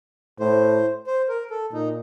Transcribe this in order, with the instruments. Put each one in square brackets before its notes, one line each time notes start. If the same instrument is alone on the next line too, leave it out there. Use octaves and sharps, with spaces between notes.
[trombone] A2 [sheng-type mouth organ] C5
[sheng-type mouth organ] C5
A#4
A4
[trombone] A#2 [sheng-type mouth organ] D#4